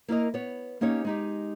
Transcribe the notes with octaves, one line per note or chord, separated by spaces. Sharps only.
A#3 E4 A#4 D#5
B3 C#5
A#3 C#4 D#4 G4 C#5
G#3 D#4 G4